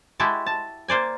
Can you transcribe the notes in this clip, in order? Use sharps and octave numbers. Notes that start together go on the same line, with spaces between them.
G#3 E4 F#4 G4 A5
A5
A#3 C5 D5 G#5